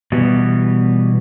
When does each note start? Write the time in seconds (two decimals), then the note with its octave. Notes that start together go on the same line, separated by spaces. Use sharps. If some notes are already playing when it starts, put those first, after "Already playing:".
0.12 B2 E3 G3 B3